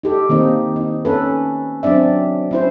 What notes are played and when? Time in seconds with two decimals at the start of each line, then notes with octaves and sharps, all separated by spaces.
0.03 D#4 G4 A4
0.29 D#3 A#3 C4 D#4
0.76 D#4
1.05 C#4 A4 B4
1.83 F#3 C4 D4 D5 E5
2.51 C#4 E4 C5